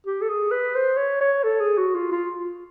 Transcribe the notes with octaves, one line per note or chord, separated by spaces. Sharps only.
G4
A4
G#4
B4
C5
C#5
C#5
A4
G#4
F#4
F4
F4